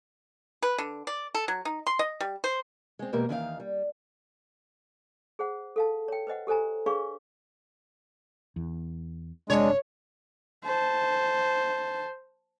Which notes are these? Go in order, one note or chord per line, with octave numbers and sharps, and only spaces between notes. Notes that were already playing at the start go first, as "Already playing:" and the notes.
B4
D3
D5
A4
F#3
D#4
C6
D#5
G3
C5
G#3 C4
E2 B2 G#3 A#3 G4 A#4
D#2 D#3 E3 D#4 C#5 F5
G3
G#4 C5 F#5
A4 F5 A5
C#5 G5
B4 C5 D#5 F#5
G4 A4 C5 G#5 A#5
D4 G#4 B4 C#5 F5 C#6
E2
F#1 C3 G#3 D4 C#5
C5 A5